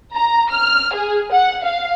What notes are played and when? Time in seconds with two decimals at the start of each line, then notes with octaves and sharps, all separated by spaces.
0.14 A#5
0.50 F6
0.93 G#4
1.31 F#5
1.63 F5